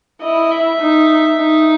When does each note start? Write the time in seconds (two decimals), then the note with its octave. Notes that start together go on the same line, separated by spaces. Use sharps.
0.21 E4 D#5
0.51 E5
0.81 D#4
1.40 D#4